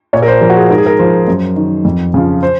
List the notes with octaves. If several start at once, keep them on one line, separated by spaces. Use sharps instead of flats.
A#2 C#5
A#4
C5
F3 A#4
F#4
G#4
G#2 A#4
G#4
A#4
F3 C5
F#2
D#3
F2
C#3 F3
C5